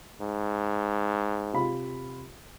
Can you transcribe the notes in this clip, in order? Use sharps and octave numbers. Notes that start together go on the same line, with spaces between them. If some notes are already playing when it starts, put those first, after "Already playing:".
G#2
C3 F4 B5